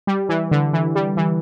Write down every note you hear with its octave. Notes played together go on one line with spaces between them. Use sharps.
G3
E3
D3
E3
G3
E3